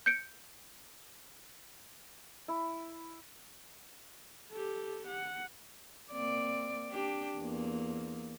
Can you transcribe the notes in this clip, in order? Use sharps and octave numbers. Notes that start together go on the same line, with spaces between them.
G6 C#7 D7
E4
G4 A4
F#5
A#3 C4 D5
D4 G4
E2 A#3